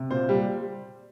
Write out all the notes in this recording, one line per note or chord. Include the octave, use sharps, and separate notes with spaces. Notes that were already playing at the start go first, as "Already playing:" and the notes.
Already playing: C3
A#2 C5
G3